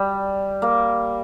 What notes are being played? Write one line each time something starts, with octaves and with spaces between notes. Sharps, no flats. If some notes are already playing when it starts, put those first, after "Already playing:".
Already playing: G3
A#3